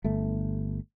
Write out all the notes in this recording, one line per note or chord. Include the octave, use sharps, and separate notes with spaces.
G1 A3